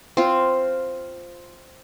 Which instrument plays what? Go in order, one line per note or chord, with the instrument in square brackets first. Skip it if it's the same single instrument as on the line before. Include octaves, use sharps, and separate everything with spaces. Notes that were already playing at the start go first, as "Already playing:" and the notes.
[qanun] C4 F4